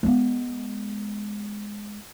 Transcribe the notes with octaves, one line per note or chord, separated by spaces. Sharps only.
G#3 B3